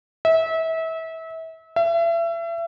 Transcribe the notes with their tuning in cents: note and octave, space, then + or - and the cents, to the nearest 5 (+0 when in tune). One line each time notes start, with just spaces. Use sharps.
E5 -30
E5 +35